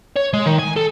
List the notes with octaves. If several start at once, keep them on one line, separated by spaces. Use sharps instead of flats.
C#5
G#3
D#3
G#5
A4